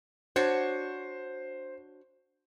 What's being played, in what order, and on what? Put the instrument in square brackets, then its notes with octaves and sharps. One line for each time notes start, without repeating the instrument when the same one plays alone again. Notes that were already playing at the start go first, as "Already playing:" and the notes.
[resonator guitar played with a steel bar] D4 F#4 C#5 [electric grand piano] C5